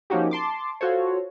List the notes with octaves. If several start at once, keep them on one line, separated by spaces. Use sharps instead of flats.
F3 A#3 C#4 D#4 F#4 G4
A5 C6 D6
F4 F#4 A4 C5 C#5